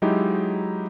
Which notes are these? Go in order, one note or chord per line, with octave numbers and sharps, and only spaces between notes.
F#3 G#3 D#4 E4 G4